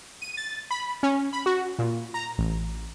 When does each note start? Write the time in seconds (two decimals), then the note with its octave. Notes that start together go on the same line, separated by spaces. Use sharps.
0.22 D#7
0.37 A6
0.71 B5
1.03 C#4
1.33 B5
1.46 F#4
1.79 A#2
2.14 A#5
2.38 A1